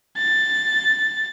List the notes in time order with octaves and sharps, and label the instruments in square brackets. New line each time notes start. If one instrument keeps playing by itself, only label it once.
[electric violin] A6